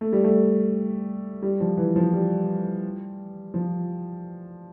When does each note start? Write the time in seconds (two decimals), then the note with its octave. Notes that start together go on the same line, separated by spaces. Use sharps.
0.01 A3
0.12 G3
0.24 A3
1.42 G3
1.60 F3
1.77 E3
1.96 F3
2.13 G3
3.54 F3